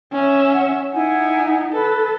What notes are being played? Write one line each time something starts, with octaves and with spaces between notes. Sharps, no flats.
C#4 E5
F#5
D#4 E4 F#5 G#5
A4 B4